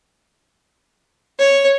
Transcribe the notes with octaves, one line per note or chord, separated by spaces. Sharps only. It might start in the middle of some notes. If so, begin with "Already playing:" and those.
C#5